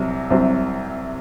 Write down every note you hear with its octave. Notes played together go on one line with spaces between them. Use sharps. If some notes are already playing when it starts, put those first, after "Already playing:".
Already playing: C2 C3 F#3
C2 C3 F#3 C5